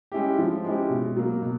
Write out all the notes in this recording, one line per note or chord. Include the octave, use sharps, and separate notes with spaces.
G#3 C#4 E4 G4
F3
G#3 C#4 E4 G4
B2
F#3 A#3
B2